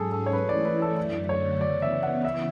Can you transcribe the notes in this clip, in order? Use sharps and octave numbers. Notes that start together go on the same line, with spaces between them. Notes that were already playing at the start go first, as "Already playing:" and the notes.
Already playing: G#2 F#3 C#4 G#4 A4
A4
C#5
E3 A3 E4 B4
D5
B4
A4
F#2 D3 F#3 A3 D5
C#5
C#3 E3 B3 D5
E5
F#5
E5